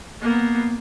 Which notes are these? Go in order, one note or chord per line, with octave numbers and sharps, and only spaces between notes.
A#3 B3